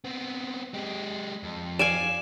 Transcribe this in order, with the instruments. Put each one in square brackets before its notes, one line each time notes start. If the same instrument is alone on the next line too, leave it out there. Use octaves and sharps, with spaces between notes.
[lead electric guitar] B3 C4
G#3 G4
F2
[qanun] D5 F5 G#5 [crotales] E7